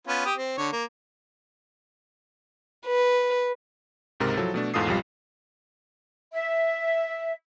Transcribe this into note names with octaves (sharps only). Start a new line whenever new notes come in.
B3 C#4 F4
G4 D#6
C4
D3 C#5
A#3
B4
C#2 G#2 C3 A#4 A6
F3 F#3 E4 A4
B2 A3 D4
E2 G#2 F4 A4 D#6 C7
B1 F2 G3 F4
E5